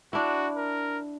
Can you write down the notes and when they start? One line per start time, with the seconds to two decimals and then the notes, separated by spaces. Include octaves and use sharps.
0.13 D4 E4 F#4
0.57 A#4